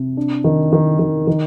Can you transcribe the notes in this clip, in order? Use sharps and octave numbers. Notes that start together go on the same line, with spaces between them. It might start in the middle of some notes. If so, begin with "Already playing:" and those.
Already playing: C3
D4
D#3
D#3
D#3
D#3